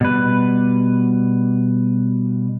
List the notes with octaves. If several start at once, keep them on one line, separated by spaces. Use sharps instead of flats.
B2 G3 B4